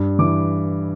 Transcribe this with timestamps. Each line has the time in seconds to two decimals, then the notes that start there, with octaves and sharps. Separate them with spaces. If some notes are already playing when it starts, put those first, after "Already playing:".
Already playing: G2
0.19 E3 D6